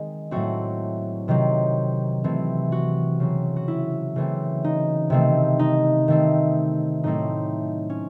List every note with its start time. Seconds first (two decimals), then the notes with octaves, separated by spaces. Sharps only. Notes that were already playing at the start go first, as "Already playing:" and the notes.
Already playing: D#3 G#3 C4 G#4
0.31 A2 F#3 A3 C4 F#4
1.28 C3 D#3 F#3 C4
2.24 C3 E3 A3 C4
2.72 F#4
3.20 C#3 F#3 C4
3.56 F#4
3.68 E4
4.16 C#3 E3 A3 C4
4.64 D#4
5.10 C3 D#3 A3 C4
5.59 D#4
6.08 D#3 A3 C4
7.04 A2 F#3 A3 C4 D#4
7.90 C#4